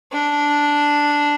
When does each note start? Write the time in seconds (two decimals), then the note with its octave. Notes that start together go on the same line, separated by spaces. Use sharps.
0.12 D4